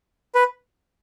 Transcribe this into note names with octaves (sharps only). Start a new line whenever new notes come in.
B4